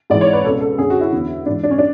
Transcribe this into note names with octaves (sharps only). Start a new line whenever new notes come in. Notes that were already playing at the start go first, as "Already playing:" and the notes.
G#2 E3 D5
C#5
B4
C#2 B2 A4
A4
F#2 D3 G#4
F#4
E4
E2 D3
G#2 E3 D4
D4
C#4
D4